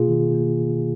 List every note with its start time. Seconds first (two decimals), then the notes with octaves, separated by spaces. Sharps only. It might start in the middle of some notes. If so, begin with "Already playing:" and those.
Already playing: B2 A#3 F4 G#4
0.08 D#3
0.34 A#3